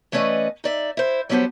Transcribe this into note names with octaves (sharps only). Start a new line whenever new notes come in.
E3 A3 C#4 B4 D5 D#5
D#4 D5 E5
E4 C5
F#3 G3 B3 D4 C5 F#5